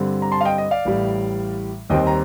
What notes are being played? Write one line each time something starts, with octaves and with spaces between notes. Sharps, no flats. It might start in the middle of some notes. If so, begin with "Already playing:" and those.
Already playing: G2 D3 G3 C4
A#5
A5 C6
F5
D#5 G5
D#5
D5 F5
A1 A2 G3
D#2 D#3 G3 C4 D#5 G5
A#5